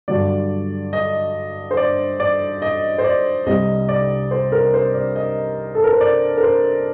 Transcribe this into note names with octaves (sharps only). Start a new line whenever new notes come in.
G2 D3 F#3 D5
D#5
C5
D5
D5
D#5
C5
D5
C2 C3 G3 D#5
D5
C5
A#4
C5
D5
D#5
A4
A#4
C5
D5
A#4
C5